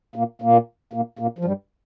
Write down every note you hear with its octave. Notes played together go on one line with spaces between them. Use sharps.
A#2 A#3
A#2 A#3
A#2 A#3
A#2 A#3
F3
G2 G3